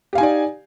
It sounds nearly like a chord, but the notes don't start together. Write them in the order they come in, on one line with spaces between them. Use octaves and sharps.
G4 F5 G#5 D#4 D5